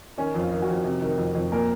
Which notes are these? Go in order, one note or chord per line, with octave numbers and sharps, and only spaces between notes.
D#3 C#4
F2
F4
D#3
F#4
F2
C3
D#3
F2
F2
A#2 A#4